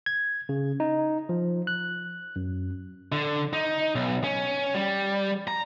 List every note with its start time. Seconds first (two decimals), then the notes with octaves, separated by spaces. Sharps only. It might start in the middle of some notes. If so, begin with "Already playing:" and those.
0.06 G#6
0.49 C#3
0.80 D#4
1.29 F3
1.67 F#6
2.36 F#2
3.12 D3
3.53 D#4
3.95 B1
4.24 C#4
4.74 G3
5.48 A#5